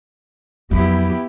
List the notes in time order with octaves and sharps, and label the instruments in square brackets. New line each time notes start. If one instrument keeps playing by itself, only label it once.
[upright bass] F2 F#3 [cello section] B3 E4 G4